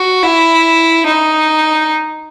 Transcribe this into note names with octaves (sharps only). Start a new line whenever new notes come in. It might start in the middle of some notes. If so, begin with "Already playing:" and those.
Already playing: F#4
E4
D#4